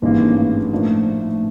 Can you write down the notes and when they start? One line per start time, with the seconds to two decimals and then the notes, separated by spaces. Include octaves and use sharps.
0.02 G#1 G2 E3 G#3 A#3 C#4
0.37 A3
0.72 A2 F3 A#3 D4